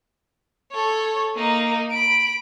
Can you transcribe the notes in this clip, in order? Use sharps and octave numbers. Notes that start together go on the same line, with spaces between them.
A4 C#5
A#3 D#4
B5 D7